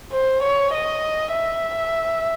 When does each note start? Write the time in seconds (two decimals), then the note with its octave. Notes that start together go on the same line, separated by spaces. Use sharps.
0.12 C5
0.43 C#5
0.74 D#5
1.34 E5